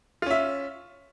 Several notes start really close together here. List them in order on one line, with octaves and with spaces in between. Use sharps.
F4 C#4 E5